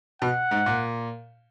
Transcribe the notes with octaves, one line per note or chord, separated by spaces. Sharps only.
B2 F#5
G#2
A#2